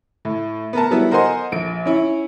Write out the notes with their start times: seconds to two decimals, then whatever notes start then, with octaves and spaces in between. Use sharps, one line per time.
0.25 A2
0.73 B3 A#4 A5
0.91 F#3 G3 B3 E4
1.11 A#4 C5 D#5 F#5 G#5 C6
1.52 A#1 D7
1.86 C#4 E4